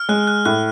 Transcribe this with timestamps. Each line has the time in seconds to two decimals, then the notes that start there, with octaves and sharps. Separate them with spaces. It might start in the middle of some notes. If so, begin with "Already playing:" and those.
Already playing: F6
0.09 G#3 F#6
0.27 F#6
0.45 A2 F#6